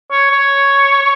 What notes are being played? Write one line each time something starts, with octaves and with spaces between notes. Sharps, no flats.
C#5
C#5